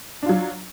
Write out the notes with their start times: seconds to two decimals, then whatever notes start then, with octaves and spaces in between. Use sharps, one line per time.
0.23 D4
0.26 F4
0.29 F#3